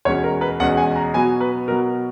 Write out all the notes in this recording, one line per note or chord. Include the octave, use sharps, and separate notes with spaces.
E2 B2 G#3 C#4 C#5
A#4
B4
E2 B2 G#3 C#4 F#5
G#5
A#5
B2 F#3 B3 G#5
B4
B2 F#3 B3 A#4